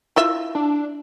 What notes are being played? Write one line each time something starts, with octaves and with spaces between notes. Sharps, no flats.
E4 F4 E5
D4